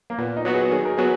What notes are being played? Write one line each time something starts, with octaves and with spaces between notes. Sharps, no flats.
A#3
A#2 B3
D#4
F#3 B3 F#4
G#4
D#3 G#4
A#4
F#3 B3 F#4 G#4